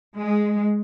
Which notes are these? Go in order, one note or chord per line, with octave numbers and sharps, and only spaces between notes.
G#3